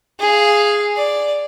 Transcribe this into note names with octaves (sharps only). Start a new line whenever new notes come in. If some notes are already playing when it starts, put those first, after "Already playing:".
G#4 F5
D5